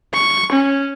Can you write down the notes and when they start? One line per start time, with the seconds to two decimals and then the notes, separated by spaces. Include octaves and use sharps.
0.14 C#6
0.53 C#4